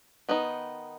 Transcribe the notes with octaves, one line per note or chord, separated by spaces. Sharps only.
D#3 B3 D#4